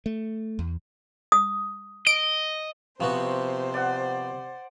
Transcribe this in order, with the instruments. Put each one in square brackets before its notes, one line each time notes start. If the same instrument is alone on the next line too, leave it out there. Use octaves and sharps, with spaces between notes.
[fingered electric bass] A3
E2
[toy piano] D#6
[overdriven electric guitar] D#5 [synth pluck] D7
[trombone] C3 [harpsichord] F3 B3 F#4 [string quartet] C5 [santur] C#6
[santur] D5 F#5